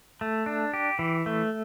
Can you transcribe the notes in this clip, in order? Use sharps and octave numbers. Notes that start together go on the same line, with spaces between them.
A3
D4
G4
E3
A3